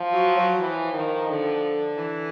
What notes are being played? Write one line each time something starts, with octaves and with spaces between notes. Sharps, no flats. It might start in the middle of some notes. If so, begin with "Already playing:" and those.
Already playing: F3
F#3
F#3
E3 F3
D#3
D3
E3